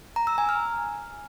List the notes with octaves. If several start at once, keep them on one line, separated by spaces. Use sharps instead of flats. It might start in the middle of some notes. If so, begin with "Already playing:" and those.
A#5
E6
G#5
F6